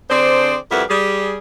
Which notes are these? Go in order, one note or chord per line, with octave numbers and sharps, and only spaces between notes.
D3 C4 D4 G#4 C5 D5
F2 G3 E4 F#4 A#4 B4
G3 G#4